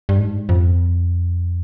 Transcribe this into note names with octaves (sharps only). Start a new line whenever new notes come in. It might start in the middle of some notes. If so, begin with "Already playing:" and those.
G2
G#2
F2